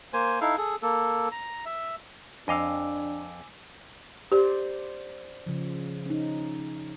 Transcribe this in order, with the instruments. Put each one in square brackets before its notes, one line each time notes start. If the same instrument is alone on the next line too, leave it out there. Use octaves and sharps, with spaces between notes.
[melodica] A#3 C5 G#5
D#4 E4 A4 F5
G#4 A4
A#3 A4
A#5
E5
[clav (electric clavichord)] F2 D#5 F5 [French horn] D4 [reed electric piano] G#5 D6 E6
[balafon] G4 [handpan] C5 D5
[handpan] C#3 F3
C#4 D#4